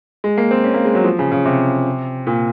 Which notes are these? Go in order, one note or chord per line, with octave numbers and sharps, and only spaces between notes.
G#3
A#3
C4
C#4
A#3
G#3
F#3
F3
C#3
C#3
C3
A#2